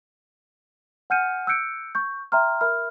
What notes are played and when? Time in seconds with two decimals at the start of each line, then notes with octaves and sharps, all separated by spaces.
1.10 F#5 G#5 F6 G6 C#7 D#7
1.47 E6 F#6 G6 C#7 D7
1.95 C#6 G6
2.32 E5 G5 A#5 C6 F6
2.61 A#4 E5 B5 F6